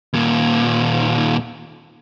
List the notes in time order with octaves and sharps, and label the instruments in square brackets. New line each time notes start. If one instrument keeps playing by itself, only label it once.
[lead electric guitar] D#2 A#2